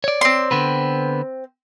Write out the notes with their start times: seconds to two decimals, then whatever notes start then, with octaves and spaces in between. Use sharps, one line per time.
0.04 C#5 D5
0.21 C4 C6
0.51 D3 B3 B4